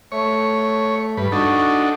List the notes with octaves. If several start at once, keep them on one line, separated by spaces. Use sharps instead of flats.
A3 C#5
G2 B4
D4 D#4 F#4 A4